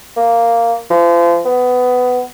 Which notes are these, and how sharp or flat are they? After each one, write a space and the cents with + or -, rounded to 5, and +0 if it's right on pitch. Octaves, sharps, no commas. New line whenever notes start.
A#3 -5
F3 -35
B3 +15